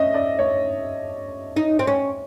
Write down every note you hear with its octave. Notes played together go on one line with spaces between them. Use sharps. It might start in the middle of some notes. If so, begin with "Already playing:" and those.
Already playing: C#4 D#5 E5
D5
C#5
D#4
C4
C#4